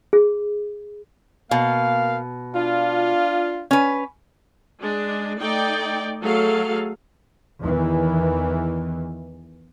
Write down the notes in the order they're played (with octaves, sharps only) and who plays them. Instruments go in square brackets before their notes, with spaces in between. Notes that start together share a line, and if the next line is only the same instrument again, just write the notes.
[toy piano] G#4
[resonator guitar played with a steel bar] B2 [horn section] A#3 F5
[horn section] D4 F4
[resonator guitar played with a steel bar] C#4 B4
[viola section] G#3 D4
A3 D#4 D5 G5
F#3 A3 G#4 A4 F5
[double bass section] E2 D#3 E3